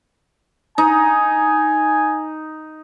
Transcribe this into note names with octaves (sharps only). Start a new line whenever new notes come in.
D#4 G#5